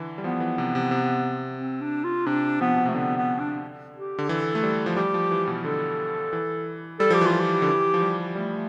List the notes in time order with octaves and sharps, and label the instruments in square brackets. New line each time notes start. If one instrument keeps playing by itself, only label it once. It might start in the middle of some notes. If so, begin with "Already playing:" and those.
Already playing: [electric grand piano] D3 E3
G3
[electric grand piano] F3 [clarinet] B3
[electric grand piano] E3
C3
C3
C3
[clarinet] C4
D4
F4
[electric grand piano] C3 [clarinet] D4
[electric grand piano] F3 [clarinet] B3
[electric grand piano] B2
[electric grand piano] C3 [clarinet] A3
[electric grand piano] D3 [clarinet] B3
[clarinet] B3
D4
G4
[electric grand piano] D3
[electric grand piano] E3 [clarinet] A4
[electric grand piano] A3
G3
F3
[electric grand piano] G3 [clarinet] G4
[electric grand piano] F3
E3
B2
[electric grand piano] D3 [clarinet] A4
[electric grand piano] E3
[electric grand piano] G3 [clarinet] A4
[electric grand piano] F3 [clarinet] G4
[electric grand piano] E3
[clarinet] F4
[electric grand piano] F3
[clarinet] G4
[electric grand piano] D3
E3
F3
G3
[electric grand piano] G3 [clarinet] A3